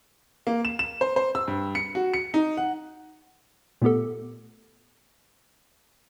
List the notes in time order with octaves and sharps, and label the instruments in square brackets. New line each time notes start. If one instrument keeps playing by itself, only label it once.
[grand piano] A#3
E7
E7
C5
C5
E6
G2
C#7
F#4
C#7
D#4
F#5
[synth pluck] A#2 A3 B3 G4 A4